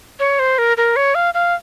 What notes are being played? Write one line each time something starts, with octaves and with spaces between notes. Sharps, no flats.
C#5
C5
A#4
A#4
C#5
F5
F5